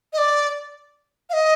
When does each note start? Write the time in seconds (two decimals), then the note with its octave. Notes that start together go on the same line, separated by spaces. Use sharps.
0.13 D#5
0.18 D5
1.30 F5
1.33 D#5